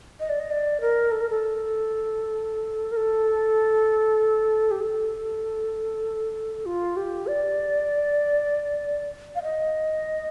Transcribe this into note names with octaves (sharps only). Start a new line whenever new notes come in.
D#5
D5
D#5
D5
A#4
A4
A#4
A4
A#4
A4
G4
A4
F4
G4
D5
F5
D#5